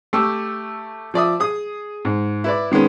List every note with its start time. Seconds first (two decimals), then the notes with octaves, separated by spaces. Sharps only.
0.13 A3 G4 C#6 E6
1.14 F3 D5 E5 D#6
1.40 G#4 D#6
2.05 G#2
2.44 E4 B4 D5
2.71 D#3 G#3 B3 C#4